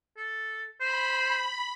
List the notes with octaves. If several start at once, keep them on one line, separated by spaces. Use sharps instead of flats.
A4
C5 B5